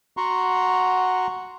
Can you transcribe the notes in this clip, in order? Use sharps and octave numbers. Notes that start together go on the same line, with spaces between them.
F#4 F#5 A#5 C6 C#6